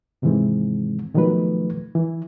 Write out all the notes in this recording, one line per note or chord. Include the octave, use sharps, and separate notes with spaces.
G#2 C3 D#3 E3 G#3 C4
B2 D#3 F3 F#3 A3 B4
E3